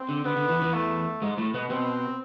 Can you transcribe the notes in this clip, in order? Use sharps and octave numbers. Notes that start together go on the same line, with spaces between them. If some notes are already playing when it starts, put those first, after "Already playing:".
Already playing: C4
D3
D3 B3
D3
E2 E3
E2 E3
A3
G#2 G#3
A2 A3
B2 B3
B2 B3 C4